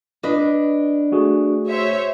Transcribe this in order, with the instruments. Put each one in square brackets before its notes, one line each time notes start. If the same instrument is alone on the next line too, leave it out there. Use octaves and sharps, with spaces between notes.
[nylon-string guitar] D4 B4 D#5
[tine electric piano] A3 F#4 G#4
[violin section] C5 C#5 E5